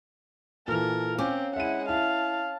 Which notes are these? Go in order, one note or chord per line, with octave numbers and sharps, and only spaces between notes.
A#2 E3 A4 A#4
C4 C#4 F5 D6
G#3 E4 E5 F#5 D#7
E4 F5 A5